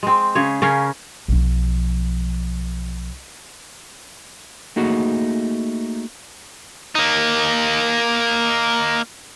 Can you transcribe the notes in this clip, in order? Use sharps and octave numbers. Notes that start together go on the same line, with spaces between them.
G#3 C4
C#3 G#4 C#5
C#3 C#4 A#4 F5
B1 F3
A3 A#3 D#4 F#4 G#4
A#3 D#4